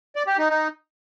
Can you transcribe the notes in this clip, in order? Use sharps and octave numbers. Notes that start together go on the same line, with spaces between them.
D5
G4
D#4
D#4